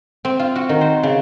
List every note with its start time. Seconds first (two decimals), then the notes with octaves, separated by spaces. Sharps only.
0.25 C4
0.39 F4
0.56 F#4
0.69 D#3
0.81 C5
1.03 C#3